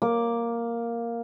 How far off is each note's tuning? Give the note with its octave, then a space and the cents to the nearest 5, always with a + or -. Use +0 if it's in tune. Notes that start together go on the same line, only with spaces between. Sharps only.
A#3 +0 D6 +0